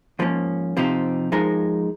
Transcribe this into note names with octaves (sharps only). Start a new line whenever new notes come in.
G#2 F3 A#3 C#4
C3 F3 C4 D#4 G4
F3 G#3 D#4 A#4